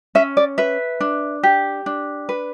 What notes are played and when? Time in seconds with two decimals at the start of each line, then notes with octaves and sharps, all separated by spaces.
0.15 C#4 E5
0.37 D5
0.58 B4 E5
1.00 D4
1.43 G4
1.86 D4
2.29 B4